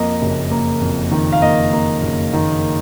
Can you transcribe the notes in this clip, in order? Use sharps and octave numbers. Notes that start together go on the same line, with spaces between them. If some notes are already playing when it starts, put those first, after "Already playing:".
Already playing: F2 A#3 D#5
F#1
A#3
F2
D#3
F5
A#3 D#5
A#3
F#1
D#3